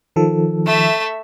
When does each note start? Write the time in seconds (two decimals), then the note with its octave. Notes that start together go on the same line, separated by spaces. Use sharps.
0.16 D#3 F3 A4
0.65 A3 E5